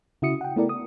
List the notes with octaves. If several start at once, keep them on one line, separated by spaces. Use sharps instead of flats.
C#3 E4 F#4 D#6 C#7
F#5 G5
A3 B3 E4 A4 A#4 D5
D#6